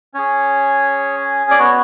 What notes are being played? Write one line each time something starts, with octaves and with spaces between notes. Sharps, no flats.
C#4 G#4 C#5
D5
B3 F#4 C#5